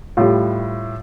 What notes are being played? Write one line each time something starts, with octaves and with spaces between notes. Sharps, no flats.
A2 G3 F4